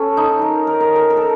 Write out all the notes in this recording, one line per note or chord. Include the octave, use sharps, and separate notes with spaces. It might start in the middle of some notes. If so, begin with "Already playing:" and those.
Already playing: C#4 A4
D#4
A#4
A#4
A#4
A#4
A#4
A4